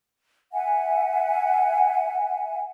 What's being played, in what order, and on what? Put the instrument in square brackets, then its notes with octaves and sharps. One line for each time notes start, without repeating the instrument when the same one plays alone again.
[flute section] E5 F#5 G#5